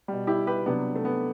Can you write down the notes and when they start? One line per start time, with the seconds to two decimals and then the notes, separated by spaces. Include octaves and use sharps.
0.08 B2 G3
0.27 E4 G4
0.47 G4 B4
0.66 C3 F#3 B3 D4
0.96 A3
1.05 B3